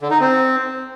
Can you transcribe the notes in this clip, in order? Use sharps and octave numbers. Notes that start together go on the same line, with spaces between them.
D3
D#4
C4